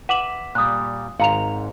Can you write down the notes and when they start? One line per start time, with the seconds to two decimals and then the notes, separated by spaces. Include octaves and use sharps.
0.09 B4 E5 F#5 D6 F#7
0.55 A#2 G3 D#6 F#6
1.19 G#1 G#2 F5 F#5 A#5 F7